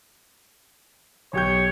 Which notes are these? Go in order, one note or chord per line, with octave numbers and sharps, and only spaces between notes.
B1 G4 C#5 G6